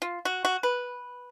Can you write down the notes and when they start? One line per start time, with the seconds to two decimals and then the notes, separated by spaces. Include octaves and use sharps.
0.02 F4
0.25 F#4
0.45 F#4
0.63 B4